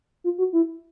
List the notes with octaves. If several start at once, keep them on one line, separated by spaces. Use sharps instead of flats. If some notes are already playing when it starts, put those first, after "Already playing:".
F4
F#4
E4